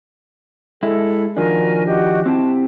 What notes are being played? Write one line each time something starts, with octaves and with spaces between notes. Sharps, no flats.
G#3 E4 A4
D#3 F3 D4 F#4 A#4 G#5
F#4 G4 D#5
C4 E4 G4 A5